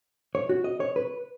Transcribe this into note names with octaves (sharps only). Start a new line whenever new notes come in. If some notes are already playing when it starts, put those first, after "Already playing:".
C#5
F#4
D#5
C#5
B4